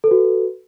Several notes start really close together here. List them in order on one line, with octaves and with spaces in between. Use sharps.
A4 B4 F#4